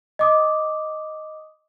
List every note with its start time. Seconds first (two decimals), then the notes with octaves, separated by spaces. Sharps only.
0.19 D#5 D6 D#6